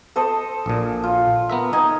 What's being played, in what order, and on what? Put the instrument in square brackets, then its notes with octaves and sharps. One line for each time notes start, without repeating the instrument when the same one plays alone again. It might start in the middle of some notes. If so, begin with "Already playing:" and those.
[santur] A4 C5 D#5
[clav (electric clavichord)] A#1 A#2
[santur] F4
[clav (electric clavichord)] B3 A#4 E5
[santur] D#4 [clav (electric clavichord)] D#5 G#5